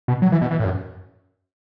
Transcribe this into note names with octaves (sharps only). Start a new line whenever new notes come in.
B2
F#3
E3
B2
E3
A2
F#2